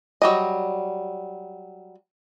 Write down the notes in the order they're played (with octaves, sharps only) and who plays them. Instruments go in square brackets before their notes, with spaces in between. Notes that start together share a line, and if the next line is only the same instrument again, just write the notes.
[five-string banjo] F#3 G3 D#5